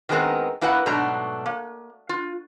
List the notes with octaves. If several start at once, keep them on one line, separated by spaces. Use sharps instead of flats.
D#3 G3 G#3 B3 C4 A#4
A#3 E4 F#4 B4 F5 F#5
G#2 B2 F#3 A3 D4 A#5
A#3
F4